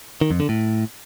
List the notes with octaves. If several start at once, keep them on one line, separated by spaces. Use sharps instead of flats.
D#3
F2
D3
A2